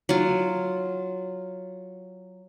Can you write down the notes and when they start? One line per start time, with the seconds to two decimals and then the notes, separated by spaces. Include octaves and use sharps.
0.09 F#3 F4